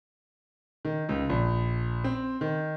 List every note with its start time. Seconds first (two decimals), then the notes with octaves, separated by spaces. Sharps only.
0.85 D#3
1.09 C#2
1.29 A#1
2.04 C4
2.41 D#3